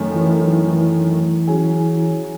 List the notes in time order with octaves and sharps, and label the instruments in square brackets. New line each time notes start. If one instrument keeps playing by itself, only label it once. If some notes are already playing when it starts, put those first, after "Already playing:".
Already playing: [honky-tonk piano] F#2 D#3 A3
[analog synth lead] E3
E3
E3
[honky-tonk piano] F#3 C#4 G#4